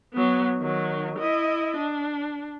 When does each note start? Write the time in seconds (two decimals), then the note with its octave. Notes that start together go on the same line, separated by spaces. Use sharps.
0.13 F#3 B3
0.58 D#3 F#3
1.19 E4 D#5
1.77 D4